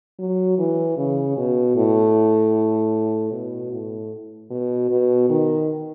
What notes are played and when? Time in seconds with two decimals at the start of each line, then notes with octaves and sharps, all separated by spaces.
0.19 F#3
0.58 E3
0.97 C#3
1.37 B2
1.76 A2
3.32 B2
3.72 A2
4.50 B2
4.90 B2
5.30 D#3